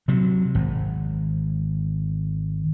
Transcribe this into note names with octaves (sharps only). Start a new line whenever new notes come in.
C3 F#3
G#1